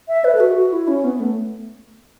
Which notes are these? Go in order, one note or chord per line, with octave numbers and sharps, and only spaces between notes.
E5
B4
A4
F#4
F#4
E4
C#4
B3
A3